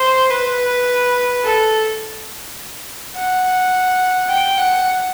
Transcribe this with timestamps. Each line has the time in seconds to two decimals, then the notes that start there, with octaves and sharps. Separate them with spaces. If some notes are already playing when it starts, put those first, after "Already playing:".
Already playing: C5
0.30 B4
1.45 A4
3.15 F#5
4.30 G5
4.58 F#5